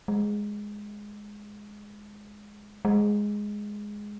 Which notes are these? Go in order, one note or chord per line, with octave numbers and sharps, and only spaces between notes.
G#3
G#3